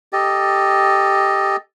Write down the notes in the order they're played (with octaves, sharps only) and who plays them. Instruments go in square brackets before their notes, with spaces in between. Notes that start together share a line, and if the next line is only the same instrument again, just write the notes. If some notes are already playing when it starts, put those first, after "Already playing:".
[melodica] G4 A4 D#5